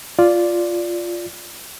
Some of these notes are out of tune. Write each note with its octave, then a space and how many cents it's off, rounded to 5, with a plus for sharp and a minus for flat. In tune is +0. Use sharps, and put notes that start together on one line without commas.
F4 +0 D5 -5